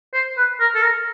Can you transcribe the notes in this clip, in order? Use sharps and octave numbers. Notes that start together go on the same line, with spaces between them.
C5
B4
A#4
A4
A#4